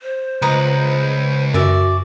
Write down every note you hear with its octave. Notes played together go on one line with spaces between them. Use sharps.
C5
C#2 B4 D#5 A#5
F#2 F#4 D5 E5